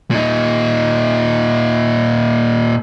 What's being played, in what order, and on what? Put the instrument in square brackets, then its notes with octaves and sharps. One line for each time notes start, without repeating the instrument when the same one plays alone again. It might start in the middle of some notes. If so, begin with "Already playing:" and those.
[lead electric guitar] A#2 D#4